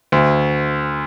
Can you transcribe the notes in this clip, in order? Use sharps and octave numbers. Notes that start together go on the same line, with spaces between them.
D2